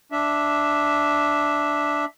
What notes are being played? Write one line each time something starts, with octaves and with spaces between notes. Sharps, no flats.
D4 E5